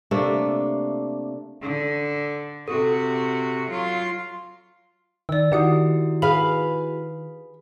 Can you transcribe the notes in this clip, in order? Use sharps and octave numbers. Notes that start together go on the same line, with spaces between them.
C3 A3 A#3 D4
D3
C3 F#4 A4
F#3 F4
D#3 D5 E6
D#3 E4 F#4 G4 F#5 D#6
G#4 B4 F5 B5